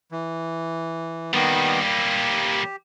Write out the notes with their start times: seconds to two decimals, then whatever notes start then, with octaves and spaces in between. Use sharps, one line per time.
0.12 E3
1.33 D#3 G3 A#3 B3
1.81 G4